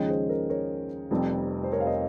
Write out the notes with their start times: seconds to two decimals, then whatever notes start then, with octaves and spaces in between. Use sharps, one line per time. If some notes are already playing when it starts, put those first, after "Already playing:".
Already playing: D#2 C#3 F3 G#3 C#4 D#5 G5
0.08 G#4 C5
0.29 A#4
0.50 A#4 C#5
1.11 F1 F2 C3 G3 C4
1.63 C5
1.72 A#4 C#5
1.80 F5
1.86 C5 D#5